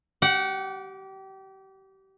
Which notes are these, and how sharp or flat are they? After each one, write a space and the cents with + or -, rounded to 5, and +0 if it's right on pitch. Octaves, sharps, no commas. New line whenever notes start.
G4 -30 F#5 +0